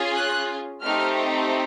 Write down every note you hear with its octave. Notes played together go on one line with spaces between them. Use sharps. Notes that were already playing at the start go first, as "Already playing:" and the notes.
Already playing: C#4 F4 G#4
F#6
A3 C4 D#4 G4 F6